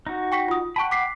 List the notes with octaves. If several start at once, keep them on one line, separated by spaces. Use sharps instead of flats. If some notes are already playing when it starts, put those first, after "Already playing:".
D#4 F#4
G5 C#6 B6
F4 D#6
F#5 G5 A5 B5 C#6
D6 B6 C7